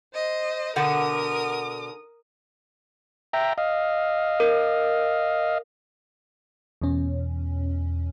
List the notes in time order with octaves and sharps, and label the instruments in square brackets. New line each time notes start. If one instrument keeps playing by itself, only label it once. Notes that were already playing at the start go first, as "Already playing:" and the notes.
[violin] C5 D#5
[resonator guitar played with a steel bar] B2 D3 F#5 [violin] A#4 D#6
[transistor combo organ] E5 G5 A#5
D#5 F5
[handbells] A#4
[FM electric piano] E2 B2 C#4